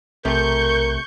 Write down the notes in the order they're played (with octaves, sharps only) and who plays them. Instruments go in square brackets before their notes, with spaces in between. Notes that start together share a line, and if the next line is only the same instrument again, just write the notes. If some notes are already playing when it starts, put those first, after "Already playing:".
[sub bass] B1 [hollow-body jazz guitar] C3 A3 [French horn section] A#4 [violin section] C#6 G6